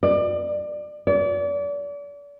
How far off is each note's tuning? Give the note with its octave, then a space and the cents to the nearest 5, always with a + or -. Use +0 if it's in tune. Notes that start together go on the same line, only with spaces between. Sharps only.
D5 +25
D5 -35